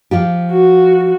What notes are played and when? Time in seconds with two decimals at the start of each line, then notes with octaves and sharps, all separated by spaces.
0.11 F3 F4 G4
0.51 F#4